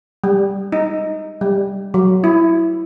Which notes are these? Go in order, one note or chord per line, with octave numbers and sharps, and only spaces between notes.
G3
D#4
G3
F#3
E4